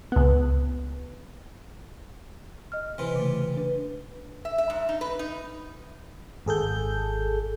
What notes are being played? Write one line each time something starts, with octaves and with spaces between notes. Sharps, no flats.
C#2 B3
D#5 F6
C3 E3
C#3 A3
D4 B4
E5
E5
G#2
D#4
B4
D#4
G#1 G#4 A4 G6